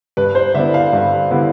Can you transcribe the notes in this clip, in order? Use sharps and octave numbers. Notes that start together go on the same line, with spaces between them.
G2 B4
C5
D3 G3 B3 E4 E5
F5
G2
D3 G3 B3 E4